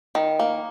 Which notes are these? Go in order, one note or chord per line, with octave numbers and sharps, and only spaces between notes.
D#3
A#3